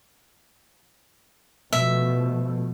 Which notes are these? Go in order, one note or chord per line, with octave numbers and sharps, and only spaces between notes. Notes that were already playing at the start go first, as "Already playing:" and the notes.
B2 F3 A3 E5